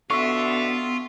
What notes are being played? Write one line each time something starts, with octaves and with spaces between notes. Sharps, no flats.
B2 D3 B3 F4 E5 C#6